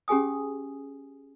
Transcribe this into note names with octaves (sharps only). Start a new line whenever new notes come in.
C#4 G4 G#4 G#5 D#6